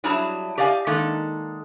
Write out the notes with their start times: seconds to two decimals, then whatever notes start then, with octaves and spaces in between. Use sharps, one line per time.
0.04 F#3 G3 E4 G#4 A5 A#5
0.58 G4 D5 D#5 F5 G#5
0.87 D#3 G#3 A#3 D#4 A4